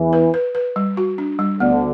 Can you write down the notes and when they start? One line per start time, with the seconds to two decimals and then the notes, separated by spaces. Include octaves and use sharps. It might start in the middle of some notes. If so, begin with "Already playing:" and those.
Already playing: E2 E3
0.13 B4
0.34 B4
0.55 B4
0.76 G3
0.97 F#4
1.18 D4
1.39 G3
1.60 D2 D3 B3